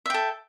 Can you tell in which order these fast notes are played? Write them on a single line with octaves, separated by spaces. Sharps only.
E5 G5 A4